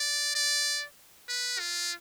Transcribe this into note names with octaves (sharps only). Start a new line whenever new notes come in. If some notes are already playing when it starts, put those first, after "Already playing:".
Already playing: D5
D5
B4
F4